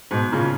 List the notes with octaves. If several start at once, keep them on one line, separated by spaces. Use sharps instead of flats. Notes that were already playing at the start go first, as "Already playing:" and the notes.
G#2 B2
A#2 C#3